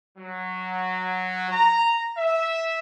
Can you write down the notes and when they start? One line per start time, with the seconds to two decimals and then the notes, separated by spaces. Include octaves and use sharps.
0.18 F#3
1.51 A#5
2.18 E5